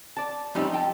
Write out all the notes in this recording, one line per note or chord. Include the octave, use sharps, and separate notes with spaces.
D5 A5
F3 G3 C4 C#4 D#4 E4
D#5 G5 A5